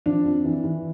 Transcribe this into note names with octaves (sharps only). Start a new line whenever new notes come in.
F3 D4
F2
E3
E3